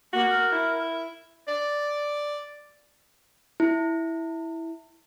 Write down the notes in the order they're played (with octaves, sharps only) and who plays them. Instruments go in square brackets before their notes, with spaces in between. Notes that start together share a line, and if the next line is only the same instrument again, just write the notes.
[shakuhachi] A#3 [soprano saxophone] F#4
[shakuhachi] A#4
[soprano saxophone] E4
D5
[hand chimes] E4